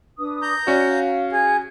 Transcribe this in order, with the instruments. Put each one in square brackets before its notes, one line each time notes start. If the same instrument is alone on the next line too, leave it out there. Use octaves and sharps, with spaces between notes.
[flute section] D4 B4 D#6
[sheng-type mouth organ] A#5 G6
[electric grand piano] C#4 F#4 [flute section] C#5 D5 E5
[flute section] F5
[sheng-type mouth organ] G#4